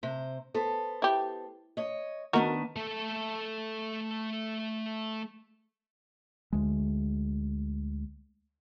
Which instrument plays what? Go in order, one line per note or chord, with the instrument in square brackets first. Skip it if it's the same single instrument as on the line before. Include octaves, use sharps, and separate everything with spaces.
[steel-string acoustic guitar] C3 C5
B3 A4 C5
[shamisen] E4 G4
[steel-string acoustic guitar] C#5 D#5
[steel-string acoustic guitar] D#3 B3 D4 [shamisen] F#4 A#4
[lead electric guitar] A3 A4
[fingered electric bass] D2 G#3